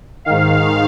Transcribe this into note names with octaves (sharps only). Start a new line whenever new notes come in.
G#2 D#3 F5